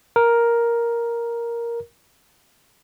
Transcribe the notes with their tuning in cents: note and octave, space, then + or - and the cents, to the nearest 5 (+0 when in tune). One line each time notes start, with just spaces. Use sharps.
A#4 +5